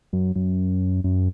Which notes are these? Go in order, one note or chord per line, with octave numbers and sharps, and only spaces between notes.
F#2
F#2
F#2